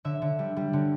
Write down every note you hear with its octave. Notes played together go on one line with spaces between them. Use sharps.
D3 E5
D3
G3
G3
D3